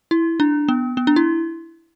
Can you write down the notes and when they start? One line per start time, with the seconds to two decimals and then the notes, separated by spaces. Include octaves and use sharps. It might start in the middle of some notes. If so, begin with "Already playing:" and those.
0.11 E4
0.40 D4
0.68 B3
0.97 B3
1.07 D4
1.16 E4